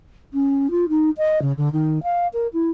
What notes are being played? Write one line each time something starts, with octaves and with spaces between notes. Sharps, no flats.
C#4
F4
D#4
D#5
C#3
D3
D#3
F5
A#4
E4